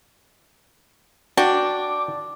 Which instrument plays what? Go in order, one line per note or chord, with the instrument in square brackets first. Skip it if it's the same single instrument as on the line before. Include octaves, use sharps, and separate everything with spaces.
[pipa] D4 [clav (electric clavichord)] F#4 G5 [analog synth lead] D6